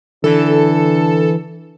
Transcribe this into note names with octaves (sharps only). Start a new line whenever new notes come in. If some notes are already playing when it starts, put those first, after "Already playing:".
D3 E3 A4